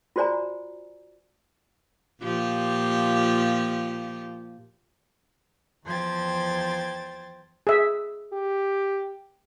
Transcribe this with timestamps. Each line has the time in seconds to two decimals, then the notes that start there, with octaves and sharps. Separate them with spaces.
0.16 F4 F#4 C5 D5 G#5 A#5
2.22 A#2 F3 G4
5.86 E2 F3 C5 G5 G#6 A6
7.67 G#4 E5
8.33 G4